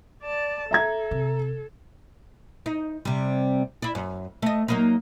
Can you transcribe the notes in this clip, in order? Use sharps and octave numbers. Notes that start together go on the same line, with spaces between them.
D5 A5
A4 E5 A#5 G#6
C3
D#4
C3 G3
E4 D5
F#2
A3 D#5
F#3 A#3 D#4